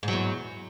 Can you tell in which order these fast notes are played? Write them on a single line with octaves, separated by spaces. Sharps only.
G#2 F#3 E2